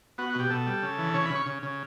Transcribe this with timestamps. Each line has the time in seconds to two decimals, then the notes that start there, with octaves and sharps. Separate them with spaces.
0.18 B3 F#4
0.30 F#4
0.35 B2 G4
0.50 B2 A4
0.67 G3
0.83 C#3
0.98 E3
1.14 C#3 C#5
1.25 C#3 B5
1.35 C#6
1.46 C#3
1.63 C#3